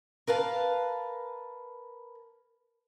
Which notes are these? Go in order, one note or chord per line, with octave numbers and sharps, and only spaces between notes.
A#4 B4 F5 A5